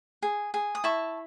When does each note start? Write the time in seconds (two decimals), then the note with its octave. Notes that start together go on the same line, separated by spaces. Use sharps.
0.22 G#4
0.54 G#4
0.75 D#6
0.84 E4 A5 C#6